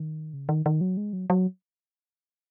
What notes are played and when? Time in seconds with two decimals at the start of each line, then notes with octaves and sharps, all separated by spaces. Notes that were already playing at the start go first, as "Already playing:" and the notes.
Already playing: D#3
0.33 C#3
0.49 D#3
0.66 D#3
0.81 F#3
0.97 G#3
1.13 F#3
1.30 F#3